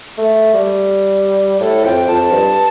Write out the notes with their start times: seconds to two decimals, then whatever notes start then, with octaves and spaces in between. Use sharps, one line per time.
0.18 A3
0.53 G3
1.60 A2 A4
1.84 F2 G5
2.08 F2 A5
2.31 G2